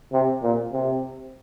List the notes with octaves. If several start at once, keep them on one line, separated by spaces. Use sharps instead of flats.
C3
A#2
C3